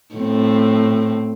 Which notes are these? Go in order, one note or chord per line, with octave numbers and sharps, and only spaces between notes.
A2 C4